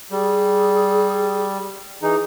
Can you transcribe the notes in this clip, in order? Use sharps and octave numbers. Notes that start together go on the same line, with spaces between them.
G3 G#4
E3 D#4 G#4